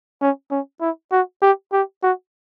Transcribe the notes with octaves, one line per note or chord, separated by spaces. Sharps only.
C#4
C#4
E4
F#4
G4
G4
F#4